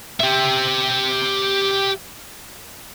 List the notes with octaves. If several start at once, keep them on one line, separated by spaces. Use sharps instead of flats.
G4 E5